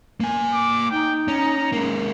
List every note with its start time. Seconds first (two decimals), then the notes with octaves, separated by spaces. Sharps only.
0.20 A#3 G#5
0.53 D6
0.91 D#4 G5
1.28 C#4 A#5
1.72 G#3 A#3